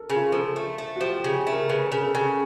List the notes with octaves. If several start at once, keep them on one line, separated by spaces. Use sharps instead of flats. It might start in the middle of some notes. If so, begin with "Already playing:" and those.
Already playing: A4 A#4
C#3
F4
F3 A4
A3
A3
F#4
F3 G4
G4
C#3
G#4
A3
A#4
C#3 B4
A#4
C#3
A4
C#3
G#4